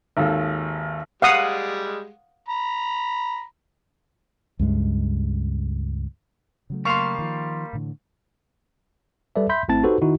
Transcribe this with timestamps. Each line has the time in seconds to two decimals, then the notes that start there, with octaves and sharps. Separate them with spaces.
0.17 G#1 D#2 A4
1.22 G3 G#3 F5 F#5 D#6
2.49 A#5 B5
4.59 C#2 G2 G#3
6.70 C#3 F#3 A3
6.85 G3 A#3 F5 C6 C#6
7.19 D#3 F3
7.73 A2 D3 E3
9.36 G3 A4 B4 D5 E5
9.49 E5 B5 C6 G6 B6
9.68 G#1 A3 C4 E4 A5 A6
9.83 D#4 F#4 G4 A4 B4 C5
10.02 D#3 D#4 E4 F#4